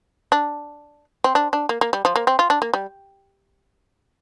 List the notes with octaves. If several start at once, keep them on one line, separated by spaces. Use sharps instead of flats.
D4
C4
D4
D4
A#3
A#3
G3
F3
A#3
C4
F4
D4
A#3
G3